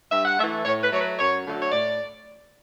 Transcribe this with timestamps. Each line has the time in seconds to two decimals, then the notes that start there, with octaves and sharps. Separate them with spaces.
0.11 G2 E5
0.25 F#5
0.39 A3 E5
0.43 E3
0.65 A2 C#5
0.83 B4
0.92 F#3 A3 C#5
1.00 B4
1.19 F#2 C#5
1.45 D3 F#3 A3
1.60 C#5
1.72 A2 D5